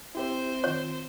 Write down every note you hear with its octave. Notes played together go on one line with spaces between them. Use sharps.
C4 E4 G4 C5 E5
D#3 F4 C#5